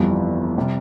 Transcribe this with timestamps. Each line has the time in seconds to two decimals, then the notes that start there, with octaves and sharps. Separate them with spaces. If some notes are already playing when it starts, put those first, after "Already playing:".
Already playing: G1 F2 E3 G3 B3
0.58 C3 G3